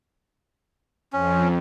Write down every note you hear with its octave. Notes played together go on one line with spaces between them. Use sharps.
F2 C#4